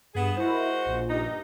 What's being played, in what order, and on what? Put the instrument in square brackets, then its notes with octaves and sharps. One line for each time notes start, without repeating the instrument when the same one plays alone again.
[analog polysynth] G2 E7 [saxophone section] B3 G#4
[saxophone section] G#3 F#4 C5 [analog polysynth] E4 A#4
[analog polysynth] A#1 A#2
[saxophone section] G2 D#4